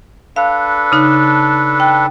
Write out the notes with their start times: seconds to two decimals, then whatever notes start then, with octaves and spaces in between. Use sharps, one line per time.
0.36 D4 A4 B4 F5
0.92 C#3 D#4
1.80 G5